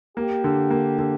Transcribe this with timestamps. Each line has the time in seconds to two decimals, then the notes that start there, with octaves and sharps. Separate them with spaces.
0.17 A#3 G4
0.44 D3
0.70 A#3
0.99 D3